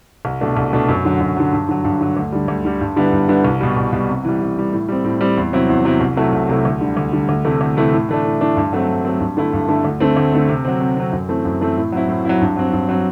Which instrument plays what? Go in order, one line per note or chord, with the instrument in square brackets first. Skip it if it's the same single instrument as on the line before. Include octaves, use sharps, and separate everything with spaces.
[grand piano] C2
B2 A3 D4
C2
B2 A3 D4
F#2
D3 F#3
F#2
D3 F#3
G2
D3 F#3
G2
D3 F#3
D2
D3 G3
D2
D3 G3
G2
D3 G3 B3 E4
G2
D3 G3 B3 E4
C2
B2 G3
C2
B2 G3
C3
E3 G3
C3
E3 G3
A2
G3 C4
A2
G3 C4
E2
C3 F#3 C4 E4
E2
C3 F#3 C4 E4
C2
C3 F#3 A3 E4
C2
C3 F#3 A3 E4
D2
D3 G3
D2
D3 G3
D2
C3 E3 A3 E4
D2
C3 E3 A3 E4
A2
E3 A3 D4
A2
E3 A3 D4
G2
F#3 A3 C4
G2
F#3 A3 C4
G2
D3 A3 E4
G2
D3 A3 E4
D2
D3 A3 C4
D2
D3 A3 C4
C3
F#3 C4
C3
F#3 C4
F#2
E3 A3 C4
F#2
E3 A3 C4
A2
F#3 C4 E4
A2
F#3 C4 E4
G2
F#3 C4
G2
F#3 C4